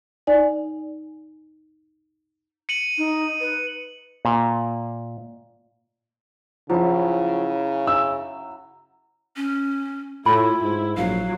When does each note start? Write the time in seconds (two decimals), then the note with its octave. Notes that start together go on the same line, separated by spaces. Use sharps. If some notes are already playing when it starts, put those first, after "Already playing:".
0.27 D#4 D5 G#5
2.69 C#7 D#7 F#7
2.97 D#4
3.40 B4
4.25 A#2
6.70 C#3 F3 F#3 E4
7.87 E6
9.36 C#4
10.26 A2 E4 F4 B5
10.62 G#2 E4
10.97 A#1 F#3 F5